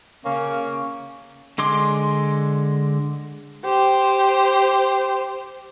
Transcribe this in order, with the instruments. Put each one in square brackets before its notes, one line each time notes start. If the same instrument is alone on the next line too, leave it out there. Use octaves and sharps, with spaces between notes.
[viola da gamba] C#3 [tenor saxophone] A#3 [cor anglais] C#4
[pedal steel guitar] D3 G#3 C6 D6
[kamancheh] G4 C5